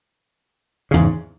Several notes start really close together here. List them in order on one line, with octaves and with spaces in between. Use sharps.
C#3 E2 G#2